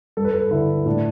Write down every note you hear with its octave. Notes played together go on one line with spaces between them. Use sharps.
G2 A4
B4
A4
D3 E4
A2 D4